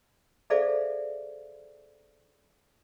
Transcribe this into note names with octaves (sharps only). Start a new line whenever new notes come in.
G#4 A4 C5 D5 E5 F5